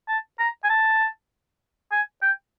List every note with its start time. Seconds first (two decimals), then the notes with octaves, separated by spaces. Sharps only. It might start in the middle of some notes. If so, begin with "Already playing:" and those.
0.09 A5
0.39 A#5
0.64 G#5
0.70 A5
1.92 G#5
2.22 G5